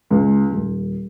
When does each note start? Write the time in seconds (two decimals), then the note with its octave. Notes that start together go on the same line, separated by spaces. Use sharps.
0.10 C#2
0.51 D#1